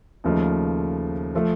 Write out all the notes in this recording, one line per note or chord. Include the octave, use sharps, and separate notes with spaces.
D#2 C#3 F3 A3 D#4
F3 A3